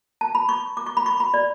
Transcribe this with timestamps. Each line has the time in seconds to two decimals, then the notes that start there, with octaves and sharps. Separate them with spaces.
0.21 A5
0.35 B5
0.49 C#6
0.77 D6
0.86 C#6
0.97 B5
1.06 C#6
1.20 B5
1.34 D5